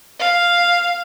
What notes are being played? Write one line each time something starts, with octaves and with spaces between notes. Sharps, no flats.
F5